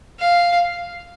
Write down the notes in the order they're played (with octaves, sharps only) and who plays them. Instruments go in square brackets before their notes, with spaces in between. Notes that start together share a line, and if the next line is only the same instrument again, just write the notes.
[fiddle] F5